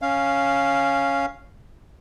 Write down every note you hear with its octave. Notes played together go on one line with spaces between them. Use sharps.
C#4 F5